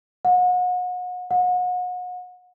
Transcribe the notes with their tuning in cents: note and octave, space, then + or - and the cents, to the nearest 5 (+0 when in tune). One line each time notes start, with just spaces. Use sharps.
F#5 -35
F#5 -35